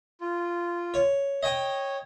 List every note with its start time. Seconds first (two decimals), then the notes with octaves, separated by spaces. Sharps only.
0.21 F4
0.94 C#5
1.43 C#5 D#5 G5